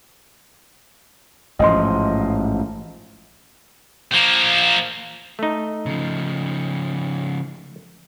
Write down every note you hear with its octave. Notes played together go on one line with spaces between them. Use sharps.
A1 G#2 F3 D#5 C6
F3 A#3
A3 D#4
C#3 F3